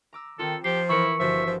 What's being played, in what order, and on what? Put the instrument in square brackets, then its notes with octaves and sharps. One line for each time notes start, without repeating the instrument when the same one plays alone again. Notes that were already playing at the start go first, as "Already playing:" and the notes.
[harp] A#5 D6 E6
[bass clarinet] D#3 [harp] C4 F4 [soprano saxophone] A4
[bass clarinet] F3 [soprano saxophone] G4 [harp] A5 [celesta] C7
[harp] E3 A#4 [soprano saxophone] E4 [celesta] C#6 C#7
[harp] G1 E4 F#4 [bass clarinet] F3 [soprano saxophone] E5
[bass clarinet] F3